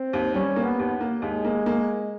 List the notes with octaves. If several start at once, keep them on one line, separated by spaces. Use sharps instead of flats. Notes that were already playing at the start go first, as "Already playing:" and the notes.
Already playing: C4
D#2
G3 C#4
A#3
B3
D#2
A#3
D#2 G#3
A#3
A#3